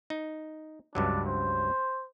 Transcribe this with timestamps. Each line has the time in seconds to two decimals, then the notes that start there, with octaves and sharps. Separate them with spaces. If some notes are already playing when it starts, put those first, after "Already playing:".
0.10 D#4
0.95 C#2 G2 F#3 D4
1.27 C5